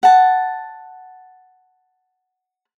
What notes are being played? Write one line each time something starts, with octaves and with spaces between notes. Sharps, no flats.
F#5 A5